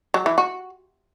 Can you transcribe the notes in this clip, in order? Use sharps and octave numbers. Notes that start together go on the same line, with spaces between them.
F#3
E3
F#4